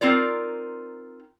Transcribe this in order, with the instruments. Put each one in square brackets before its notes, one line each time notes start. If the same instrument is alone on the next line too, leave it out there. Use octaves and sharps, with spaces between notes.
[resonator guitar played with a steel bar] C4 D#4 F4 A#4 D5